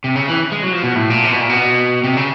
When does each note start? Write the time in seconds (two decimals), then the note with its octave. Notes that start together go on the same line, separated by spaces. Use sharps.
0.04 C3
0.16 C#3
0.28 E3
0.52 G#3
0.63 F#3
0.73 F3
0.83 B2
0.95 A2
1.10 A#2
1.24 C3
1.31 B2
1.41 A#2
1.49 B2
2.04 C3
2.17 C#3